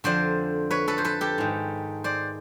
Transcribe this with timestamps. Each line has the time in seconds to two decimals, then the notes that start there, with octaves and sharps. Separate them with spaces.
0.04 F2 D3 C5 D5
0.71 B4 C#5
0.88 A4 B4
0.98 C5
1.04 A4 B4
1.21 G4 A4
1.38 G#2 D#3
2.04 C5 D5